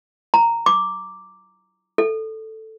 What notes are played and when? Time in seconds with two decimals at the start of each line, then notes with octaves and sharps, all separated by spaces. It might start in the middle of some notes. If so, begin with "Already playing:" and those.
0.34 A#5
0.66 D6
1.98 A4